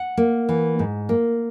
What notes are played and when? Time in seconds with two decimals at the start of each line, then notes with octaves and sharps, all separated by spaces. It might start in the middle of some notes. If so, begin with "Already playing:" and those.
Already playing: F#5
0.17 A#3
0.49 E3
0.79 G#2
1.09 A#3